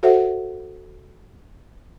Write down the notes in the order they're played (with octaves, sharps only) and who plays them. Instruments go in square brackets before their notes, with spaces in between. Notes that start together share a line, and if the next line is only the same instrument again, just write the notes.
[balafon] F#4 A4 C5 E5 F#5